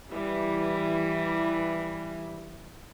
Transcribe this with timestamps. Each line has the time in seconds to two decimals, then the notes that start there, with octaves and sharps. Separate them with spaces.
0.11 E3 G3